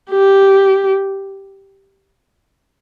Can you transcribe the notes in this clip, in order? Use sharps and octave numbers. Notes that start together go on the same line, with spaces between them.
G4